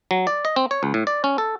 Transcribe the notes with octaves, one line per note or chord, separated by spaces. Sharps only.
F#3
D5
D#5
C4
C#5
C#2
A2
D5
C#4
A4